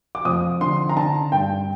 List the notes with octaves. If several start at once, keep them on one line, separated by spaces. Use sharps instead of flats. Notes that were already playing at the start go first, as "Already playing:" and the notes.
D6
F2 D#6
D3 C6
A#5
D3 A5
G2 G5